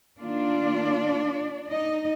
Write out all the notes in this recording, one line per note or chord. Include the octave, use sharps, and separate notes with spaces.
D#3 A#3 D4 F4 D5
D#4 D#5